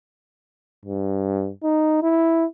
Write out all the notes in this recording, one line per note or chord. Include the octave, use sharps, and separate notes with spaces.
G2
D#4
E4